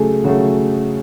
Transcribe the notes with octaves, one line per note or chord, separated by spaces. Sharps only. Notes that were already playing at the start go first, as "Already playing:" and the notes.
Already playing: C#3 F#3 A3 G#4 A4
C#3 F#3 A3 F#4